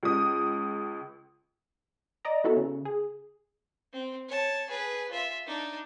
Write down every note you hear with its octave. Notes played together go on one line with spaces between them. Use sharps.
C#2 D#6
D5 D#5 A#5
B3 E4 F#4 A4
C#3
G#4
C4
C#5 A5
G#4 B4
F4 E5
D4 D#4